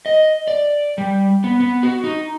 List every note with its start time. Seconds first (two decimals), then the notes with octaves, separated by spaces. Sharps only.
0.06 D#5
0.48 D5
0.98 G3
1.44 B3
1.60 B3
1.83 F#4
2.04 D#4